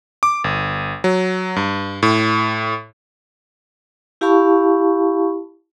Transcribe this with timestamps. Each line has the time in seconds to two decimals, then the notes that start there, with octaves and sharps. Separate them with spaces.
0.23 D6
0.44 G1
1.04 F#3
1.56 G2
2.03 A2
4.21 E4 G4 F5 A5 B5 C#6